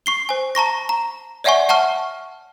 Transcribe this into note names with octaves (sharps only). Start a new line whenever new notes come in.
C#6 C7 G7
C5 G#5
A5 A#5 C#6 A#6
A#5
C#5 D5 E5 F#5 G#5 C#6
E5 F#5 A5 C#6 F6